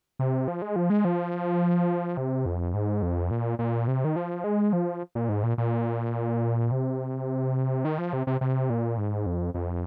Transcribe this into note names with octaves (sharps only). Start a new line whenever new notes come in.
C3
F3
G#3
F3
G#3
F3
C3
F2
G#2
F2
A#2
A#2
C3
D#3
F3
G#3
F3
A#2
G#2
A#2
A#2
C3
D#3
F3
C3
C3
C3
A#2
G#2
F2
F2